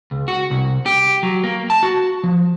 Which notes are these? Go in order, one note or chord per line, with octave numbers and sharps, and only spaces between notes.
C#2
F#4
C2
G4
F#3
A#3
A5
F#4
F3